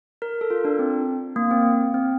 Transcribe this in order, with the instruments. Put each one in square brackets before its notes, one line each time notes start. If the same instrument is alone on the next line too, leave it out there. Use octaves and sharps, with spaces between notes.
[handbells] A#4
A4
F4
D4
C4
A#3
C4
C4